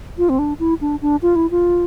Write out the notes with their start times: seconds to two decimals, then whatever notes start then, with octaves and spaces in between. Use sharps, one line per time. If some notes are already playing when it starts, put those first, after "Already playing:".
0.18 F4
0.29 C4
0.39 D4
0.60 E4
0.81 D4
1.02 D4
1.22 F4
1.36 E4
1.51 F4